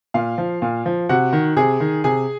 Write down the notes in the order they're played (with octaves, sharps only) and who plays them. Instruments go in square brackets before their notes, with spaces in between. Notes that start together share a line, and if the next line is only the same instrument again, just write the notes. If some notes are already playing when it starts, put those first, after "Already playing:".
[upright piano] A#2 F5
F3
A#2
F3
C3 F#4 F#5
D#3
C3 G#4 G#5
D#3
C3 G#4 G#5